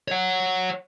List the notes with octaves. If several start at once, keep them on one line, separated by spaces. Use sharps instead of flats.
C#5 F#5